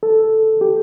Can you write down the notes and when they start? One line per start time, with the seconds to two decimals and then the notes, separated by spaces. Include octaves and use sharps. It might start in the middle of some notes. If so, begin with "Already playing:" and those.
0.03 A4
0.61 G4